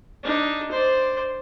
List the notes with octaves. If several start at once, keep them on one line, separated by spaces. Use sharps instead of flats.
D4 D#4
C5 D5